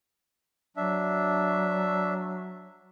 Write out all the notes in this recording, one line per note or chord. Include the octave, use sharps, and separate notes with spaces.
F#3 D4 E5